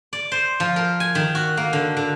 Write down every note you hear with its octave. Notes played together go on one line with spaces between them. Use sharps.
D5
C5
F3
A#4
G#5
D#3
F#4
A#3
D3
D3